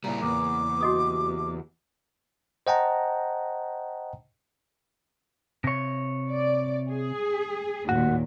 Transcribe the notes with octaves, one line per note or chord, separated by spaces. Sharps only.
A#2 C#3 G3 E4 A#5
E2 A#3 B4 D6
F#4 G4 D#5 D#6
C5 D#5 F#5 G5 A5 A#5
C3 C#5
D5
G#4
D#2 A#2 F#4